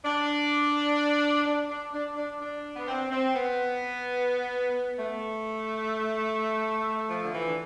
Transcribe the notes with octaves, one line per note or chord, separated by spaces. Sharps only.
D4
D4
D4
D4
D4
D4
B3
C4
C4
B3
A3
F3
D3
E3
D3